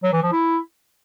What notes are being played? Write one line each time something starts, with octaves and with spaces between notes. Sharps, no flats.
F#3
E3
F3
E4